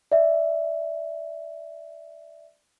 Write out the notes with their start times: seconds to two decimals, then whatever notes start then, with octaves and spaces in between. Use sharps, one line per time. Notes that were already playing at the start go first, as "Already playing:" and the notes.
0.12 D5 E5